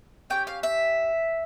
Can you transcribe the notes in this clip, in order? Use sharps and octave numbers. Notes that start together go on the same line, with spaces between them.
C#4 G4 G5
F5
E5